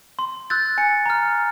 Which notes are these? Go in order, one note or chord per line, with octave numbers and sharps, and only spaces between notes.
C6
E6 F#6 G6 A6
G#5 C#7
A#5 F6